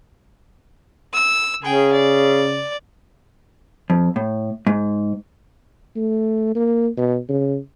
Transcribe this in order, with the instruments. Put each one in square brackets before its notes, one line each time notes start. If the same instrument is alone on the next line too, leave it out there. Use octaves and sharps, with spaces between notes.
[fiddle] E6
[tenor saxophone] C#3 [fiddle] G#4 G5
[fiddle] D5
[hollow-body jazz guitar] F2
A2
G#2
[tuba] A3
A#3
B2
C#3